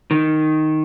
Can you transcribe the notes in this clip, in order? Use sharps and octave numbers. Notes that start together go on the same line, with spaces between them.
D#3